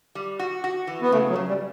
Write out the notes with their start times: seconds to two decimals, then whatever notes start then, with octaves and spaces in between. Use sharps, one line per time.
0.15 G3
0.39 F#4
0.64 F#4
0.87 E3
1.02 B3
1.12 C#3 A3
1.29 F#3
1.36 C#3
1.48 G3